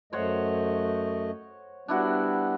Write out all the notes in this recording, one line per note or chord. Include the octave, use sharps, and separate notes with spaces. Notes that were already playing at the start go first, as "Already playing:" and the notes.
F#2 A3 C5 C#5 D#5 F#5
G3 B3 D4 E4 F#4